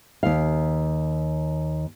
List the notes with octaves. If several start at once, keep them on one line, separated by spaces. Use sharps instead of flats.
D#2 F5